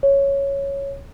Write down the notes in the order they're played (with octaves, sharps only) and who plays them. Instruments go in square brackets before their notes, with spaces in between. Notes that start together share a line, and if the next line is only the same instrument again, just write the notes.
[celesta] C#5